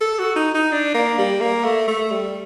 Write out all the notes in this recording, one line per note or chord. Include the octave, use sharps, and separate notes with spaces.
A4
F#4
D#4
D#4
D4
A#3
G3
A#3
A3
A3
G3